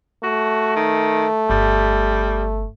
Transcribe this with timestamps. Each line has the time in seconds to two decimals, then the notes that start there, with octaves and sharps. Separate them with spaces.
0.23 A3 F#4
0.76 D#3
1.50 G1 G3